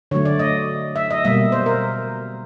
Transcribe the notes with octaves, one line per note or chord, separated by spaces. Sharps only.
D3 F#3 A3 C#5
D5
D#5
E5
D#5
B2 G3 A#3 E5
C5
A#4